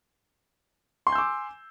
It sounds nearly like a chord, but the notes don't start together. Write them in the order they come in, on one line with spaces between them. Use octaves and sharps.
C6 G#5 G6 E6 D6